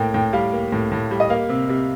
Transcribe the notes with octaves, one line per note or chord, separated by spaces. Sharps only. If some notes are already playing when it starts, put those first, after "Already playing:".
Already playing: A2 A#3 G5
A2 G5
G3 F5
A#3
A2
A2
G3
D#5
A#3 F5
C3
C3